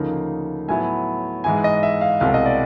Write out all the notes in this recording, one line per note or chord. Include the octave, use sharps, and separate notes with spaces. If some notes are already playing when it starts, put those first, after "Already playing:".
Already playing: D2 C#3 F3 A#3 D#4
A2 F#3 B3 E4 G#5
G#2 E3 G#3 G#5
D#5
E5
F5
C2 B2 G#3 C4 F5
D#5
D5